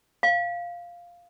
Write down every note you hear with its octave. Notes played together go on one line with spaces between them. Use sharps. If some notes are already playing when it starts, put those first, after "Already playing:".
F5